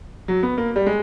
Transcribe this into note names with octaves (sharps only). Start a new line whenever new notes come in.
F#3
B3
A#3
G3
G#3